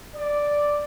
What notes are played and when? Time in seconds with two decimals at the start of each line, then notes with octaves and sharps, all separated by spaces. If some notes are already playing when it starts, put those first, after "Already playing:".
0.15 D5